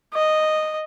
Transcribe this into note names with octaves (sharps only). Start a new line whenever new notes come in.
D#5